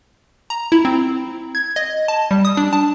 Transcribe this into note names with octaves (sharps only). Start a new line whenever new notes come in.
A#5
E4
C4
G#6
D#5
A5
G3
D#6
D4
A5